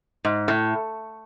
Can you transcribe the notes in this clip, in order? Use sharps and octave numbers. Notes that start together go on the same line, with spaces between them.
G#2
A2